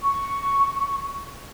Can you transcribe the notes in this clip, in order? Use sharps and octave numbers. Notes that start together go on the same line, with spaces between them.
C#6